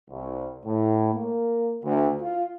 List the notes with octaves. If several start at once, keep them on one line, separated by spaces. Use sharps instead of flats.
C2
A2
A#3
D2
F4